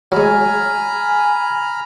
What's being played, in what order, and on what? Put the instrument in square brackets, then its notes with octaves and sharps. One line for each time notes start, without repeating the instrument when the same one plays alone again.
[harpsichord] F#3 G#3 [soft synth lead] G#5 [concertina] A#5 B5 F6